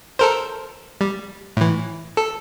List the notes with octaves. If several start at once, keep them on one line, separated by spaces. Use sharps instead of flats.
A4 A#4 C5
G3
A2 E3
A4